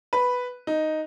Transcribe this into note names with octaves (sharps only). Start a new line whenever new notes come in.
B4
D#4